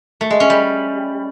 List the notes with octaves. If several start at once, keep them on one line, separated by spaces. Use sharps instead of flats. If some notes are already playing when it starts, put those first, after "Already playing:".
A3
G#3
C#4
G3